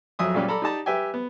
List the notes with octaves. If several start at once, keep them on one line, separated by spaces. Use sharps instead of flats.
F2 F#3 E5 G#5 D#6
A#2 F#3 G3 C#4 G4
A4 D5 A#5 B5
D#4 G4 D5 A5 A#5
G4 B4 E5 G5 G#5
B3